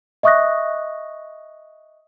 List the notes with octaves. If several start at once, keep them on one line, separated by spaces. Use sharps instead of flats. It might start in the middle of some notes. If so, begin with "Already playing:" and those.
D#5 E5 C#6 D#6 F#6 A#6